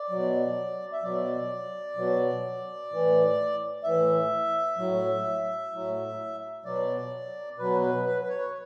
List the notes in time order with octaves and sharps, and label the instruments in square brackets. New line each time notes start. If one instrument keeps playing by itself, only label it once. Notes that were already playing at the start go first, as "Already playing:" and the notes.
Already playing: [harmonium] D5
B2 F#3
E5
B2 F#3 D5
B2 F#3
A2 E3
A2 E3 E5
A2 F#3
A2 F#3
B2 F#3 D5
B2 F#3 B4
B4
B4
B4
C#5